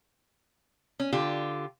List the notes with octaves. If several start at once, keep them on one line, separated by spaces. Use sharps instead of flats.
C#4
D3 F4 G4